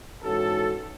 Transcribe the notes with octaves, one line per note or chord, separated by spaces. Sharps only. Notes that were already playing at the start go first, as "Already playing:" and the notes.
G#2 E3 C#4 F#4 A4